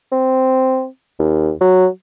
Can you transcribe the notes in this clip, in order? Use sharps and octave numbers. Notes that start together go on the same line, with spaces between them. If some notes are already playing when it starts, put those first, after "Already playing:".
C4
D#2
F#3